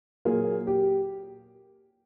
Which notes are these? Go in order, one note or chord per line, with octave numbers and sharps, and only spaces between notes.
A#2 F#3 A#3 G#4
G4